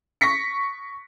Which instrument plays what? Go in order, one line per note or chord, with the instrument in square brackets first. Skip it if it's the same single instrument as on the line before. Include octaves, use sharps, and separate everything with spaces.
[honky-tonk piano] C#6 A#6 B6 C#7